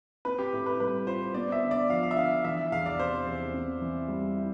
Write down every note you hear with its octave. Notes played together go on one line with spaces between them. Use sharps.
C4 B4
G4
A2
B4
G3 B4
F4 C5
B3 D5
E5
D3
D5
F3 F5
F5
E5
D3 F5
E3 E5
E2 F5
D5
C3 C5
E2
C4
E3
G3
E4